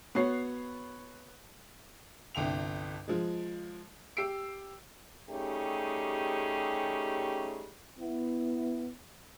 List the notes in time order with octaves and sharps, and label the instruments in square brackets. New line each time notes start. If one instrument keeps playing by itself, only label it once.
[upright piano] B3 F#4 C#5 C7
[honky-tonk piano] G1 C2 G5 F7
F3 G#3
G4 E6 C7 D7
[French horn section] G3 A3 C#4 D#4 G4 G#4
B3 E4